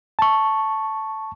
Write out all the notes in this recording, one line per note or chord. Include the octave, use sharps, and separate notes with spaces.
A5 C#6